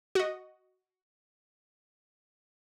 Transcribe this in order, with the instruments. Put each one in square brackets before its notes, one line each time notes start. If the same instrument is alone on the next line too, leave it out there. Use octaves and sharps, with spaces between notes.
[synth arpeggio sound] F#4 D#5